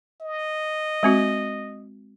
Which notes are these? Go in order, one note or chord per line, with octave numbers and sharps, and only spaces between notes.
D#5
G#3 C4 F#4